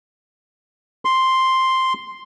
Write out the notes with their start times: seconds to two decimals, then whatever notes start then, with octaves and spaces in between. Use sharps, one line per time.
1.05 C6